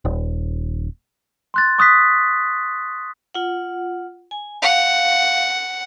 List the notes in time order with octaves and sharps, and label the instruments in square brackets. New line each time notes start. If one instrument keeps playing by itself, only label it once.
[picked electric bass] D#1
[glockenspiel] C6 F#6 A6
C#6 D#6 F#6 B6
[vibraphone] F4 F#5
G#5
[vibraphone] F5 [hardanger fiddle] F#5